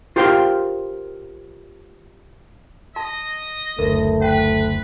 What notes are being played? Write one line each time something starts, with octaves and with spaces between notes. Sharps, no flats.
F4 G4 A#4 C5 F5 G5
D#5 A5
F#1 D2 A3 A#4
B4 F#5 G5